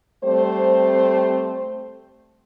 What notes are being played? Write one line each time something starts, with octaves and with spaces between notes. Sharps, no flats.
G3 A3 C4 C5